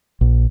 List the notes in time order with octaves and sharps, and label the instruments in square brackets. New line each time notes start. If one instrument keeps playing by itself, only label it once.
[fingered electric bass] A#1